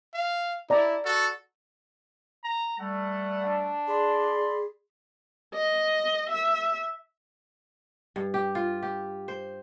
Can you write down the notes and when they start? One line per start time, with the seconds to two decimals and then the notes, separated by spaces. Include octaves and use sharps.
0.14 F5
0.70 E4 D5 A#5
1.05 F#4 A4
2.44 A#5
2.79 G3 A3 F#5
3.45 D4
3.88 G#4 D5 B5 C6
5.54 D#5
6.30 E5
8.16 G2
8.34 G4
8.55 F4
8.83 G4
9.28 C5